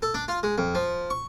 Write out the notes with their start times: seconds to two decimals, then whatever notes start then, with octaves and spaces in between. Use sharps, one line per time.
0.02 A4
0.14 D4
0.28 F4
0.43 G#3
0.58 F2
0.75 F3
1.10 C#6